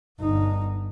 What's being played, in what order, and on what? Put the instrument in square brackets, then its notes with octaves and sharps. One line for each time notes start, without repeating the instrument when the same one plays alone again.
[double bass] G1 D#4